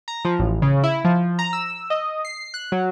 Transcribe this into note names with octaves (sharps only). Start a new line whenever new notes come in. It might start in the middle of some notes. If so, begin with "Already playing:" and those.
A#5
F3
A1
C#3
E4
F3
A#5
E6
D#5
C7
F#6
F#3